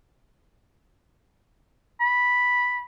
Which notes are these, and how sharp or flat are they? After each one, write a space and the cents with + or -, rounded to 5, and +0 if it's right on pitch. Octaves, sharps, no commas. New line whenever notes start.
B5 -5